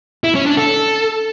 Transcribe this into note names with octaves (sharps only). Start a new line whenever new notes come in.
E4
C#4
D4
A4